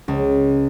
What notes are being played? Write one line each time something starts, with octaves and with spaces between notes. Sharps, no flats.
C#2